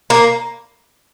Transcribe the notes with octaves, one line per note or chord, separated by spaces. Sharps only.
A#3